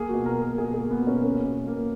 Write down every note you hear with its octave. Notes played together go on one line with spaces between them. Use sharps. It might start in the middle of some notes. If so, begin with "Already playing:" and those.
Already playing: A#3 G#4
F#4
B2
A#4
A#3
A#4
B2 G#4
G#4
A#3
B3
B2
C#4
A#3 C#4
B2
A#3